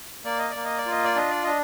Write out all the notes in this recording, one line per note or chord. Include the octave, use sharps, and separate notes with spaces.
A#3 D5
D#5
A#3 D5
D#5
D5
F4
D#5
D5
D4 D#5
D5
D4 D#5